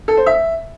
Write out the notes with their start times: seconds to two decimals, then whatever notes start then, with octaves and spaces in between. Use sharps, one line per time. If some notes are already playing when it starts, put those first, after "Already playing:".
0.08 A4
0.17 C5
0.26 E5